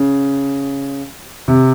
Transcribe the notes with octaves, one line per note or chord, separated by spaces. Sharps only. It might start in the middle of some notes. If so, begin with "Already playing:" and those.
Already playing: C#3
C3